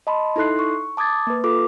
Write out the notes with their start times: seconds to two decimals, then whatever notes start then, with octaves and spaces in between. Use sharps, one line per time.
0.07 D#5 A5 B5 C6
0.36 D#4 E4 A4 C6 F#6 C7
0.59 C#6
0.97 A5 D6 D#6 G#6 A6
1.27 A#3 B4
1.44 F4 A4 D6